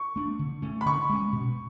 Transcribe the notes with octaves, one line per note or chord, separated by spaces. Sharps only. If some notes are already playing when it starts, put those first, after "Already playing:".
Already playing: C#6
A3 D4
D3
A3 C#4
B5
D3 C#6
G#3 C#4
B2